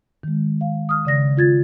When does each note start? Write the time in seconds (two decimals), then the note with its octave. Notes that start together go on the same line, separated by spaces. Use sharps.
0.23 D#3 G#3
0.61 F5
0.89 D#6 F6
1.05 C#3 D5 A#6
1.37 F4 G#6 A6